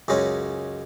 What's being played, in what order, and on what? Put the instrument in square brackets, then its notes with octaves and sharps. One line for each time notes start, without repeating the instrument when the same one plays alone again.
[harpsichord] C#2 F#2 G#3 C#4